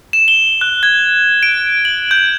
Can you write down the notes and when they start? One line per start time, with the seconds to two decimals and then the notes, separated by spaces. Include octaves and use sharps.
0.13 E7
0.28 G7
0.61 F#6
0.83 G#6
1.43 D7
1.85 F#7
2.11 G6